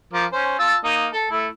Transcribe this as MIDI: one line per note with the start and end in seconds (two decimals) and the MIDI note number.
0.13 0.25 53
0.13 0.25 70
0.13 0.25 86
0.33 0.57 61
0.33 0.57 72
0.59 0.76 65
0.59 0.76 81
0.59 0.76 88
0.84 1.08 58
0.84 1.08 63
1.13 1.26 69
1.30 1.48 57
1.30 1.48 64